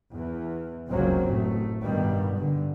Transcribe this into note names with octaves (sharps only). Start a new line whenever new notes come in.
E2 E3
F1 C#2 F#2 F#3 A#3 C4
A1 A3
G2 B2 D#3 G3
G2 D3